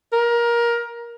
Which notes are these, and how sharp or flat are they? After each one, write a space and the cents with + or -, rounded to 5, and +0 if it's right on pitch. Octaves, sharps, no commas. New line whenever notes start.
A#4 +20